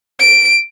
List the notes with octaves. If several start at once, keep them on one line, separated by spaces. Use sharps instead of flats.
D7